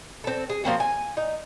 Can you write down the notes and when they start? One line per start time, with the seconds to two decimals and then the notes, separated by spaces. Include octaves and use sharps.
0.24 C4 A4
0.50 G#4
0.64 F3 A#3 C4 F#4
0.80 G#5
1.17 D#4